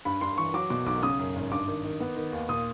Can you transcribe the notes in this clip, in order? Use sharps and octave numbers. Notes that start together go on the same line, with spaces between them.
G2 B5
G2 C6
E3 C#6
F#3 D6
B2 D6
B1 D6
C#3 D#6
F#2
G#1
G2 D6
D#3
D#3
B3
D#3
D#2
A#2 D#6